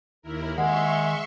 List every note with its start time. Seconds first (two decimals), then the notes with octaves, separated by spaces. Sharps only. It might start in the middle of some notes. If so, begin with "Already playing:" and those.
0.22 D#2 E4 A#4
0.58 D#3 G#3 E5 F#5 C6 C#6